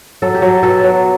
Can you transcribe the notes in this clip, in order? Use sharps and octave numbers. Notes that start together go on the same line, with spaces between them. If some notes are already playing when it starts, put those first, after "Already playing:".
F#3 A4
G4
F#3
A4
B2 A4
F#3